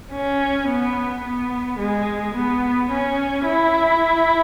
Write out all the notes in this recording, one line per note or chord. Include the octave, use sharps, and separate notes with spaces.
C#4
B3
B3
G#3
B3
C#4
E4